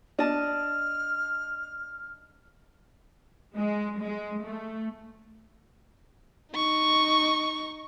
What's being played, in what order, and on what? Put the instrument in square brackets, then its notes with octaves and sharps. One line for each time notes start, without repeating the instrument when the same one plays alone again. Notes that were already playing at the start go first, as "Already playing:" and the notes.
[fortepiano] D4 [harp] D#5 A5 [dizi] F6
[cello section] G#3
G#3
A3
[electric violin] D#4 C#6